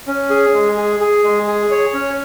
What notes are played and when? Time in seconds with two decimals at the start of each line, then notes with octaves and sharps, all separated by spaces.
0.07 C#4
0.30 G#4
0.54 G#3
0.77 G#4
1.00 G#4
1.24 G#3
1.47 G#4
1.71 C#5
1.94 C#4